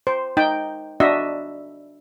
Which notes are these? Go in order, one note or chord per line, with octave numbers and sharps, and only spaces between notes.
C5
D#4 G5
D4 F#4 D#5 E5